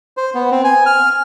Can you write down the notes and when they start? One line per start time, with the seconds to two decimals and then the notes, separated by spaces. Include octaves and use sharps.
0.17 C5
0.35 B3
0.51 C4
0.64 G#5
0.86 F6